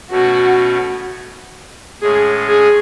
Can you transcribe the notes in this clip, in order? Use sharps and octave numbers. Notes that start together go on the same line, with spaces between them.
B2 A3 C#4 F#4
A2 G#3 C#4 G#4
G#4